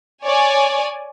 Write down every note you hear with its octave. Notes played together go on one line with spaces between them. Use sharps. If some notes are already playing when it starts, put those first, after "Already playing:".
C#5 D5 G#5